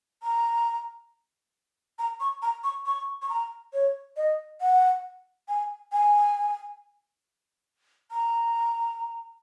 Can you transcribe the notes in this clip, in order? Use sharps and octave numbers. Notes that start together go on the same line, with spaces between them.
A#5
A#5
C#6
A#5
C#6
C#6
C#6
A#5
C#5
D#5
F#5
G#5
G#5
A#5